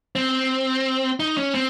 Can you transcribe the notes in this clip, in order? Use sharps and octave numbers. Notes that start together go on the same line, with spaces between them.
C4
D#4
C#4
C4